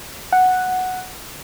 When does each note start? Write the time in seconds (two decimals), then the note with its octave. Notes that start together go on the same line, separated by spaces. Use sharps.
0.33 F#5